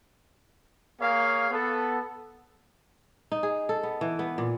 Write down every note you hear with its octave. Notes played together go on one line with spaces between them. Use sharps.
A#3 G#4 C#5 F5
B3 A4
D#4
G#4
A4
B3
E3
B3
A#2